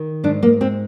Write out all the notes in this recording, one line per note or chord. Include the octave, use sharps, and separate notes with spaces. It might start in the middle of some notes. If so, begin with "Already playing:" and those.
Already playing: D#3
G#2 D4
A#3
G#3 C4